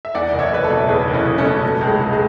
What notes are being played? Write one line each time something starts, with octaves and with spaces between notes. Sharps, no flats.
E5
E2 D5 F#5
F#1
C#5 E5
F#1 B4
A4 C#5
B2
E2 G#4 B4
F#1
C#4 E4
F#1
A3 C#4
B2
B2 A3
C#2
G#3
C#2
G#3